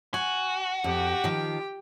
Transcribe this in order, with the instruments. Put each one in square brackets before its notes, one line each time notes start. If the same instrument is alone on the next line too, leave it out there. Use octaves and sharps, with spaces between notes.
[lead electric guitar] F#4 [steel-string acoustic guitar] G#5
[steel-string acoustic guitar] F2 [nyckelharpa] G4 G5
[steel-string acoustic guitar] D#3 F3